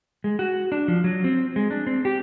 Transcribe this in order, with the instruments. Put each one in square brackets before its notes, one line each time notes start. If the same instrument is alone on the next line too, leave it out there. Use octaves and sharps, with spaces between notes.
[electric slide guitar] G#3
F#4
D4
F3
F#3
C4
G#3
D4
C4
G4